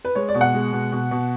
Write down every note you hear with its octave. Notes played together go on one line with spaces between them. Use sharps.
B4
G#3 C#5
D5
B2
F#5
G#3
B2
B2
B2